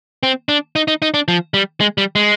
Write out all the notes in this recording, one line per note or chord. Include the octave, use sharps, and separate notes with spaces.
C4
D4
D#4
D#4
D#4
D4
F3
G3
G#3
G3
G#3